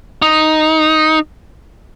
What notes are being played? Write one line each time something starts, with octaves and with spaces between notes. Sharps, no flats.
D#4